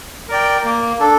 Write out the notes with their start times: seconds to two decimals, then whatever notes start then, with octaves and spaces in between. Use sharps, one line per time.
0.29 A#4 D5 G5
0.64 A#3
1.00 D4 A4